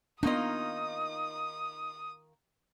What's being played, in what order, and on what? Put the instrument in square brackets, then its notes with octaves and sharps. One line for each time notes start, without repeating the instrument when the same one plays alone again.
[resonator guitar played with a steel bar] D#3 A#3 F4 [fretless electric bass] B3 D4 [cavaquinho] D#4 D#5 [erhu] D#6